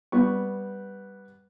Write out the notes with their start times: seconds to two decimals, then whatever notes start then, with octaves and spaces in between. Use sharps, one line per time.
0.12 G3 B3 C#6